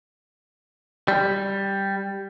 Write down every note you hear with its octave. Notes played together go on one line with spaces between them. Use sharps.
G3